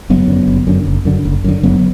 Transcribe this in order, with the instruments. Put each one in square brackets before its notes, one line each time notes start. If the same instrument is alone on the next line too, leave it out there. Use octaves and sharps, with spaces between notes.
[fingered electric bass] F#1 F#3 B3
F#2 D3
F#1
F#2 D3
F#1
F#2 D3
F#1
F#2 D3
F#1 F#3 B3